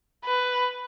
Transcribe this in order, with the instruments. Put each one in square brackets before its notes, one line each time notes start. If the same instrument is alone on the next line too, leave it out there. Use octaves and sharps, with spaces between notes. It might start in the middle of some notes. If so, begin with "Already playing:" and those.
[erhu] B4